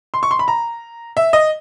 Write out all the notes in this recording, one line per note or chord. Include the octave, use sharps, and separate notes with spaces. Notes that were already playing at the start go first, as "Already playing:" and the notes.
C6
C#6
C6
B5
A#5
E5
D#5